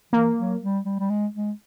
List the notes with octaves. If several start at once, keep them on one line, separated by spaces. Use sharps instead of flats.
E3 A#3
F#3
G3
G3
G3
G#3
G#3